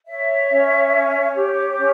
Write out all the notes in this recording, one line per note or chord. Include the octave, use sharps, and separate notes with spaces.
C#5 E5
C#4
C#5
G4
C#4 C#5